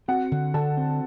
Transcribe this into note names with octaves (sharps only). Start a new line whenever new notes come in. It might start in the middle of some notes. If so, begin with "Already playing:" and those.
C4 F#4 F#5
D3
D3 A4 A5
C4